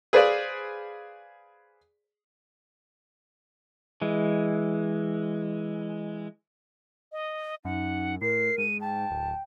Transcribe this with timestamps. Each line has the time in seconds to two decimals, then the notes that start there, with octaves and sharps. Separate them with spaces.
0.13 G#4 B4 C5 D5 F5
4.01 E3 G#3
7.12 D#5
7.65 F#2 D#4 F#5
8.21 A2 A#4 C7
8.58 G#2 D#7
8.81 G5 A5
9.11 D1